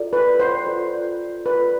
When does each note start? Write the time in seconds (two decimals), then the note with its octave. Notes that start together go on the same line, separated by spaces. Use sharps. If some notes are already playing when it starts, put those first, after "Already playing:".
Already playing: F4 A4 D5
0.13 B4
0.39 C5
0.66 F4 A4 D5
1.46 F4 A4 B4 D5